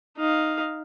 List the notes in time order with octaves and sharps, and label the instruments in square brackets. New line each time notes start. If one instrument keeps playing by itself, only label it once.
[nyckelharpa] D#4 F5